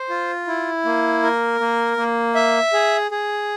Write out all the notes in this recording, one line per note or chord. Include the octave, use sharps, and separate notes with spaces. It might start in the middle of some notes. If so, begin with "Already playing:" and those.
Already playing: C5
F4
E4
A#3
A#4
A#3
A#3
E5
G#4
G#4